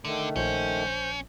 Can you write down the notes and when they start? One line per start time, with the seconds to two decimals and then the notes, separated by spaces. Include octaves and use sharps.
0.05 D3 D#3 A3
0.36 A#1 C#4 C5